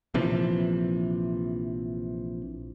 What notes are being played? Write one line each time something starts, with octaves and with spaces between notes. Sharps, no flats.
A#1 C3 E3 F3